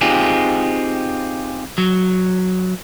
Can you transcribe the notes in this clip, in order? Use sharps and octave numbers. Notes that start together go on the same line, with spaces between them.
C4 D#4 F4 G4 G#4
F#3